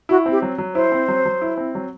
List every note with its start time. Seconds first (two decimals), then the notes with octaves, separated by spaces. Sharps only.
0.09 E4 F#4
0.26 C4
0.32 G4
0.42 F#3
0.58 F#3
0.75 E4 C5
0.92 C4
1.08 F#3
1.25 F#3
1.41 E4
1.58 C4
1.75 F#3